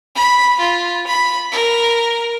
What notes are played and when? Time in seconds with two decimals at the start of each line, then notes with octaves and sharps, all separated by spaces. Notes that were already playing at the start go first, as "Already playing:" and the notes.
0.15 B5
0.60 F4
1.07 B5
1.52 A#4